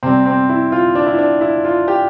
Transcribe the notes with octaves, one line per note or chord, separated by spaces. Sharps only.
C3 G3 C4
C4
E4
F4
D4
E4
D4
E4
F4
G4